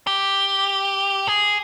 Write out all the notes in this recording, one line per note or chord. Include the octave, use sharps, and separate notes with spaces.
G4
G#4